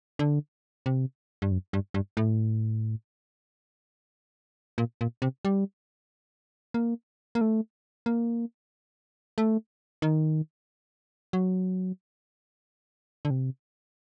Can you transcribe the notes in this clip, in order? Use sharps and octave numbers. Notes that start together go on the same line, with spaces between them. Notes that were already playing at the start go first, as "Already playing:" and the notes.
D3
C3
G2
F#2
G2
G2
A2
A#2
A#2
C3
G3
A#3
A#3
A3
A#3
A3
D#3
F#3
D3
C3